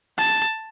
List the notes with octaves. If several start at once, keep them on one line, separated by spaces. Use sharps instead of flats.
A5